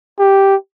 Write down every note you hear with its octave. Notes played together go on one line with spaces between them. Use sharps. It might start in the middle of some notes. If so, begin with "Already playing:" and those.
G4